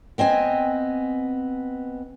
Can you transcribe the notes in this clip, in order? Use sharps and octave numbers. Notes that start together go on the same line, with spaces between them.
B3 C4 D#5 G#5